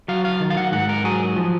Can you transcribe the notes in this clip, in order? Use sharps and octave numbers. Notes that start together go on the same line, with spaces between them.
F#3 F5
F5
D#3
F5
F#5
G#2 F#5
A#4
F#3 G#4
F3